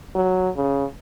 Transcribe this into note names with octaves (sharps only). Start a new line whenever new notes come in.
F#3
C#3